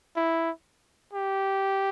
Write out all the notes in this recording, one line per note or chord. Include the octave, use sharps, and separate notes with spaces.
E4
G4